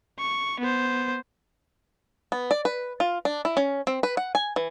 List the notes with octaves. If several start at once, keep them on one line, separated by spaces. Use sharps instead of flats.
C#6
B3 C5
B3
D5
B4
F4
D4
E4
C#4
C4
B4
F#5
G#5
E3